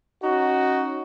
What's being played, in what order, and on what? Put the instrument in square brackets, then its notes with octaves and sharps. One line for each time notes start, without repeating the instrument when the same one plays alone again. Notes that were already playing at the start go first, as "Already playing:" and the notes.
[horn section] C#4 D#4 F#4